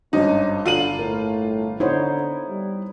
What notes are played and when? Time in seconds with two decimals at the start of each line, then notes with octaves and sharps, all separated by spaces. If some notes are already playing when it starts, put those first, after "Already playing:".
0.13 G#1 G2 C#4 D#4
0.66 G1 D3 F4 D#7 F#7
0.99 A2 A#4
1.80 D3 B3 D#4 E4 C5 C#5
2.50 G3